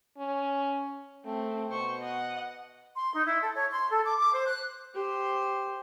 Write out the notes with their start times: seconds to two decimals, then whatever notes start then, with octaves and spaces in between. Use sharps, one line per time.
0.18 C#4
1.25 A3 C4
1.70 B2 C5 C#6
1.99 D#5 F#5
2.97 C6
3.13 D#4
3.26 E4
3.41 A4
3.56 C#5
3.73 C6
3.90 A4
4.05 D6
4.18 D6
4.33 C5
4.47 F#6
4.94 G4 C5